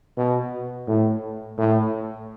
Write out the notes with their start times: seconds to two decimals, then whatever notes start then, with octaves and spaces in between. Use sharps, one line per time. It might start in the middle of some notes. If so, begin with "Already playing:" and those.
0.17 B2
0.87 A2
1.58 A2